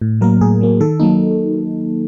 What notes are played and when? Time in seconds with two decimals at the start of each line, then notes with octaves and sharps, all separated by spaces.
0.01 A2
0.21 F#3 A#3 A#4
0.41 A2 G#4
0.61 F#3 A#3
0.80 D#3 A4
1.00 F#3 A#3 D#4